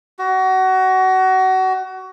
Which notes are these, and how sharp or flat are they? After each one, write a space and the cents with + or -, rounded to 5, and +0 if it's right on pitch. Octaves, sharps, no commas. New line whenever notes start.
F#4 +25